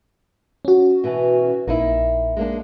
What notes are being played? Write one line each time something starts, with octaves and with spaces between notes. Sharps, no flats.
C#4 F#4
B2 E3
A#1 A#3 D#4 E4
G#3 A#3 D4